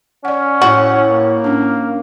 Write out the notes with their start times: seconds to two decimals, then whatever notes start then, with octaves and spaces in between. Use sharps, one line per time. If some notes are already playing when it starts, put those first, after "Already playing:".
0.25 C#4 D5 F#5
0.62 A2 E4 F#4 C#5
1.11 A#3
1.44 C#4 D4